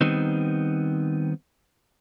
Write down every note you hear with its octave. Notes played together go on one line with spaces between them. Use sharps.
D#3 G3 B3 C4 D#4